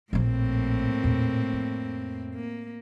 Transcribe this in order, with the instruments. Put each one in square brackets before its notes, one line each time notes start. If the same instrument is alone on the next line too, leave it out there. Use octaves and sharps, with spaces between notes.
[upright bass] A#1 F3 [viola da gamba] A2 A#3 C4
[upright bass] E2 A#2
F2
[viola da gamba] A#3